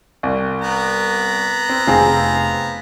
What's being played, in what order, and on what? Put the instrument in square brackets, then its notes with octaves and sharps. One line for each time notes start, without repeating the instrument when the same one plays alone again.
[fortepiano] C2
[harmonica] B3 A#5
[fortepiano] C4
[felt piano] F1 G#4 A#6 [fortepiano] C4 F5